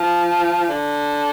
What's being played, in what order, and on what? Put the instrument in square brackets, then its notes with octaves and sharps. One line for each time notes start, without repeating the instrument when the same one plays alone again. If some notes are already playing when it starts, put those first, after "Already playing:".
Already playing: [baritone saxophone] F3
D3